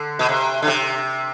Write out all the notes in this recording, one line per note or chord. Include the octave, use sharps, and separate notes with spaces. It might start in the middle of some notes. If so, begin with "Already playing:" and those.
Already playing: D3
B2
C3
D3
C3